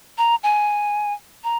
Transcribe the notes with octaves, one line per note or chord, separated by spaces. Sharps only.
A#5
G#5
A#5